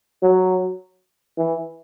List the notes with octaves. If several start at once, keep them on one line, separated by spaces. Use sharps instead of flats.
F#3
E3